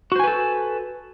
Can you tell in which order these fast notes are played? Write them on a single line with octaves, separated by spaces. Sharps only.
F#4 C5 G#5 B4 A4